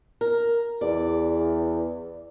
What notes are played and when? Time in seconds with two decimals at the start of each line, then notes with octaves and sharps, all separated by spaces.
0.21 A#4
0.81 E2 D5